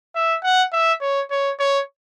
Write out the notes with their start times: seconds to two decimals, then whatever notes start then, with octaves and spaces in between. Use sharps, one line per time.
0.16 E5
0.44 F#5
0.73 E5
1.01 C#5
1.31 C#5
1.60 C#5